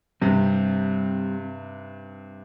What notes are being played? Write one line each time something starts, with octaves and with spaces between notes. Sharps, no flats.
G2 C3 G3 C4 G4